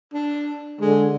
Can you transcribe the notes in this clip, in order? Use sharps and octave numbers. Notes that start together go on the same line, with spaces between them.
D4
D3 G#3